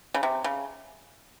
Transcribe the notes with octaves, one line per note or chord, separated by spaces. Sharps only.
C#3
C3
C#3